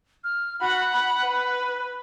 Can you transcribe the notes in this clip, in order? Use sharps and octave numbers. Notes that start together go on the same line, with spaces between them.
F6
F#4 F#5 B5
B5
B4